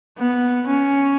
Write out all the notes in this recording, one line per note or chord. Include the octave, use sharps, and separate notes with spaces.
B3
C#4